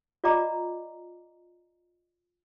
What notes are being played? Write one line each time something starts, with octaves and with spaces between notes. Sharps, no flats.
F4 D5 D#5 F#5 A#5 D6